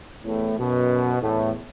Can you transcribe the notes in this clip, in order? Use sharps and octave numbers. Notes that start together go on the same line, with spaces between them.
E2 A2
F#2 B2
E2 A2